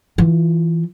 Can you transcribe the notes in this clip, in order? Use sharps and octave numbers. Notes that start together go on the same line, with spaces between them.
E3 F4